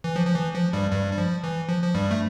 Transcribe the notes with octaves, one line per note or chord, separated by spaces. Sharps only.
E3
F3
F3
E3
F3
G2 G3
G2 G3
G3
F3
E3
F3
F3
G2 G3
A3